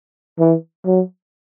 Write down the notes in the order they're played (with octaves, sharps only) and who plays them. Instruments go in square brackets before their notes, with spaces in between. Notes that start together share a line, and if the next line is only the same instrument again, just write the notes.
[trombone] E3
F#3